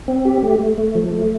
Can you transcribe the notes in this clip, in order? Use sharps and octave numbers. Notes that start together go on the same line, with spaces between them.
C4
G4
A3
A3
A3
F3
A3